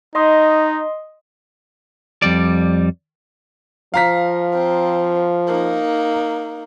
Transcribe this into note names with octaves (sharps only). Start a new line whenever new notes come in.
D#4 D#5 C6 D#6
F2 G3 D5
F3 F5 A#5 B6
C4
A#3 D#4